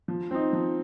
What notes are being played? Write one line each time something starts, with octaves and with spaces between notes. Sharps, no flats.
F3
C4 D#4
F3